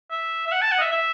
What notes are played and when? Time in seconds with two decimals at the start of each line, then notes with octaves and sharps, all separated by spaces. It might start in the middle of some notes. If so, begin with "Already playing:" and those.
0.11 E5
0.47 E5
0.52 F#5
0.62 A5
0.72 F#5
0.78 D#5
0.82 E5
0.92 E5